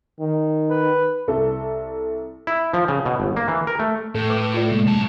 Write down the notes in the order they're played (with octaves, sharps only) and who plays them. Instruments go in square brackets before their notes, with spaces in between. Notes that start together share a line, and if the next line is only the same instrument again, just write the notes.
[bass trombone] D#3
[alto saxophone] B4
[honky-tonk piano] C2 A4
[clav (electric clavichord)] E4
F3
C#3
B2
G1
A#3
E3
A#4
A3
[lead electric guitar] A2 [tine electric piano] A4
[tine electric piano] B4 D6
F4 A4 D5
C3 G#3 A#3
[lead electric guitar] F#2 A5